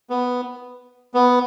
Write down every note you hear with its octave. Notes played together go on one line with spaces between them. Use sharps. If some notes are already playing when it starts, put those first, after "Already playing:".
B3
B3